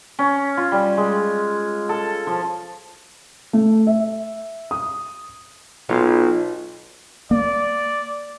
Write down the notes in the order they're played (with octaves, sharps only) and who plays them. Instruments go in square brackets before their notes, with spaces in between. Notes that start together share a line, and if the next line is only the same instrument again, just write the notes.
[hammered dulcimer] C#4
F4
G3
G#3
A4
F3
[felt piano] A3
E5
D#6
[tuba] B1 [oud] F4
[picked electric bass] A#3 [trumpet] D5